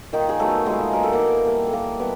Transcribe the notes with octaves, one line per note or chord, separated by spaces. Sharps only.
A#2 D#3 D#4
G#4
F#3 A3 B3 A4
A#2 G#3 G#4
F#3 B3 A#4
A4
A#3 A#4
E3
G3 A#3
A4
E3 A#3 A#4
G3 B3 B4